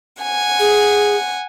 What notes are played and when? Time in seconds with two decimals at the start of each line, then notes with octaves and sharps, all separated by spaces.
0.23 F#5 G#5
0.59 G#4